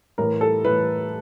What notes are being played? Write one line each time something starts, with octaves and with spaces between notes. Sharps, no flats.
A2 E3 A#4
A4
A2 E3 B4